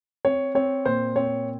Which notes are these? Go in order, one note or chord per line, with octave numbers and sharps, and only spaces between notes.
C4 C#5
C4 C#5
A#2 C5
C4 C#5